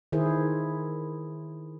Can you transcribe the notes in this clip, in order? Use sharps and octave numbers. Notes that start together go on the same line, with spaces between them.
D#3 E4 G#4 A#4 C5